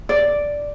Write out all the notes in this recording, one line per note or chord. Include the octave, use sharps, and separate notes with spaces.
D5